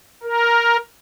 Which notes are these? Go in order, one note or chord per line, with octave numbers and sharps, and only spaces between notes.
A#4